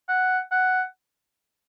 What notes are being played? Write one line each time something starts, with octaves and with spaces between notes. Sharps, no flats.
F#5
F#5